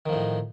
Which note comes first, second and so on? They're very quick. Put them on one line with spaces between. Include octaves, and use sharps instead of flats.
D#3 F3 A2